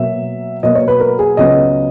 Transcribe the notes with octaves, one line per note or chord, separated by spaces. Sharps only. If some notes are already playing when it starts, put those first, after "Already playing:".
Already playing: B2 F#3 A#3 E5
B2 F#3 A#3 D#5
C#5
B4
A#4
G#4
C#2 C#3 F#3 B3 D#5